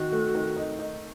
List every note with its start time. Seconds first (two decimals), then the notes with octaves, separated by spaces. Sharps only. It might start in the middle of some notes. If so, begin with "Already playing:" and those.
Already playing: D#3 D#4 F#4
0.12 A3
0.35 D#3
0.56 D#4
0.79 D#4